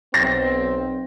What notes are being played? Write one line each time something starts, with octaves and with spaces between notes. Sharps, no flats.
B1 C4 A#6